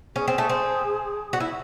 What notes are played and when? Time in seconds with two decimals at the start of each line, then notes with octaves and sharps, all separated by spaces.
0.16 C#4 G#4
0.28 C4
0.38 A3
0.49 C4
1.33 F#4
1.40 E4